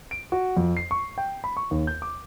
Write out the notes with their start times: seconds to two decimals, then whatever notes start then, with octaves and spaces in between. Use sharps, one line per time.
0.11 D7
0.32 F#4
0.57 F2
0.77 C7
0.91 C#6
1.18 G5
1.44 B5
1.57 C#6
1.71 D#2
1.87 G6
2.02 D6